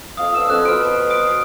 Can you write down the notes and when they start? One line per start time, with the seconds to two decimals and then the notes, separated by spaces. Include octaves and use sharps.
0.17 F2 F5 D#6
0.34 B3 D4 E6
0.50 F2 F#6
0.65 B2 B4 C5 F6 D7
1.10 D#6 D7